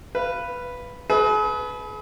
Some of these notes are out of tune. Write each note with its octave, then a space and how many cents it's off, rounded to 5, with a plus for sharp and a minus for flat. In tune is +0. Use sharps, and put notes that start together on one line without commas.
B4 +0 F5 -20
G#4 +40 B4 +0